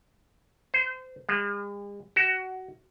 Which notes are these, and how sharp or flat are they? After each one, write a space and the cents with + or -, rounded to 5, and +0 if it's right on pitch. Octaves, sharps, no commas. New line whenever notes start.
C5 -25
G#3 -45
F#4 +20